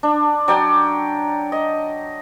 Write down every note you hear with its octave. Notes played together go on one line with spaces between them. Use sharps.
D4
F#3 D5 G5
D#5